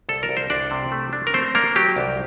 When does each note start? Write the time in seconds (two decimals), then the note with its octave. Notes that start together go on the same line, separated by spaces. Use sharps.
0.09 C2 A4
0.23 A#4
0.29 C2
0.37 C5
0.50 C2 D4 D5
0.71 C3
0.92 A3
1.13 D4
1.27 A#4
1.34 A3 C4 C5
1.55 A#3 D4 A#4
1.76 F#3 G4
1.96 C2